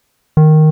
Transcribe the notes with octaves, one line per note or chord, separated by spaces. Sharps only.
D#3